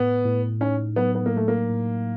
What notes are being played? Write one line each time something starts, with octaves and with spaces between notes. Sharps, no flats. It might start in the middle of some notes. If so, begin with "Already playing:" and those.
Already playing: A2 B3
A2
C#4 D#4
F#3 B3
B3
A#3
A2 A3
A#3
A2